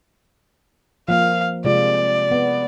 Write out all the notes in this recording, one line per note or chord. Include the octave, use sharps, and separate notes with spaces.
F3 A#3 F5
C3 G#3 F4 D5
B3